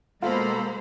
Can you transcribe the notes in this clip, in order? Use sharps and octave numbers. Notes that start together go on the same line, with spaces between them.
B2 G#3 A#3 F4 A4 C5 A#5 B5